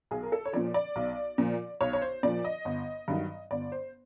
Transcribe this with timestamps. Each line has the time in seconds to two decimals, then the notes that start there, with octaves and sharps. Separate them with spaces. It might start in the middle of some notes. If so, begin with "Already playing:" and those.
0.11 B1 G#4
0.23 A#4
0.32 A4
0.46 C#5
0.53 A#2 F3 D5
0.74 D5
0.96 B1
1.38 A#2 F3
1.81 B1 C#5
1.93 C#5
2.02 C5
2.23 A#2 F3 D5
2.44 D#5
2.65 G1
3.08 G2 D#3 F#3
3.51 G1 D5
3.72 C5